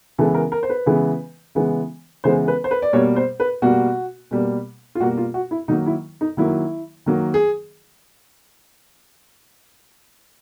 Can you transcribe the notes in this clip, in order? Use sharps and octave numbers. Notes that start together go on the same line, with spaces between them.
C#3 E3 G#3 B3 A4
A#4
A#4
C5
B4
C#3 E3 G#3 B3
C#3 E3 G#3 B3
C#3 E3 G#3 B3 C5
B4
C5
B4
D5
B2 G3 A#3 C#5
C5
B4
B2 G3 A#3 F#4
B2 G3 A#3
F4
B2 G3 A#3 F#4
F4
F#4
E4
D#3 F#3 A#3 D#4
E4
D#4
D#3 F#3 A#3 E4
D#3 F#3 A#3
G#4